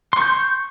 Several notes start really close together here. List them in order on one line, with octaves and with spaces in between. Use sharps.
C6 C#6 G6